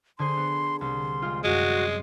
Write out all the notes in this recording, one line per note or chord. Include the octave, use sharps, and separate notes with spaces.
D3 G#4 C5 C6
B3
C2 C6
G#3 C4 F4
F#2 G3 G#3 F#4
C6 C7